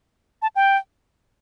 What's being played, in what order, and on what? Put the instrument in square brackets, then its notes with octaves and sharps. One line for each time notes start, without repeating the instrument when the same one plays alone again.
[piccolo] A5
G5